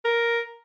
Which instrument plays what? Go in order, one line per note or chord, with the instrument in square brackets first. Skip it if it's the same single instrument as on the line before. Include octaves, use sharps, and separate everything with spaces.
[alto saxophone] A#4